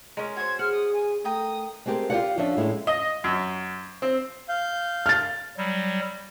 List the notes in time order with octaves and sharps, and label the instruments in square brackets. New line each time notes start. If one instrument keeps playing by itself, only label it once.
[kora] G#3 C#4 [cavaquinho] A#4
[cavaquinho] F#4 C5 [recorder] G#6
[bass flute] G#4 [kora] F#5 [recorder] F6
[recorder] D#6
G#5
[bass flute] A3 [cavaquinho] A#4 G5 A#5 [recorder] D#6
[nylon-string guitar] G#3 A3 C4 G4 G#4 A#4
F4 G4 G#4 C5 D5 F#5
F3 C#4 D4 E5
A2 G#3 C#4 E4
[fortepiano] D#5
F#2
C4
[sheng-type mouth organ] F5 G6
[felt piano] F6 A6
[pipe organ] F#3 G3